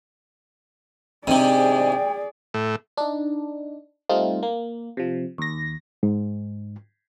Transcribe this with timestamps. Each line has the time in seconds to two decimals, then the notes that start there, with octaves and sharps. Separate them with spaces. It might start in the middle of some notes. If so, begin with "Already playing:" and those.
1.27 G#2 C3 C4 D4 G#4 D5 G5
2.54 A2
2.97 D4 D#4
4.09 G3 A3 C4 D#4 F4
4.43 A#3
4.97 C3 F3
5.38 D#2 A#6
6.03 G#2